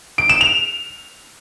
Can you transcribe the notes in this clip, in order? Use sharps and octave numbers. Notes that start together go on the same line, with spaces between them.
D7
E7
F7